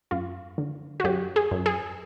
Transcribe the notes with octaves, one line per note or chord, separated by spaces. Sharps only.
F#2 F4
D3
F#4
F#2 G4
G#4
F#2
G#4